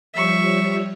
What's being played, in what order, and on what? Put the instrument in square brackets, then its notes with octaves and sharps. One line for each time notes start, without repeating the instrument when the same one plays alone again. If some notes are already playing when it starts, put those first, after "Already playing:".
[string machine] F3 G3 C#5 [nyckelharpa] E5 C#6